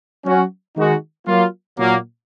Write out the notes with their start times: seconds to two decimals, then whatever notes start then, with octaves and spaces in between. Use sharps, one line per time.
0.25 F#3 C#4 F#4
0.76 D#3 G#3 D#4 F#4
1.27 F#3 A#3 F4
1.78 A#2 F#3 A#3